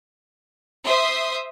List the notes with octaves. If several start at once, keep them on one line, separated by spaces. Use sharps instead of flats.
C5 E5 C6 D#6